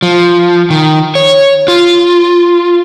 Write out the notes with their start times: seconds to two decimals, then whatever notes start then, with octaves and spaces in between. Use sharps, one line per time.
0.02 F3
0.70 D#3
1.15 C#5
1.68 F4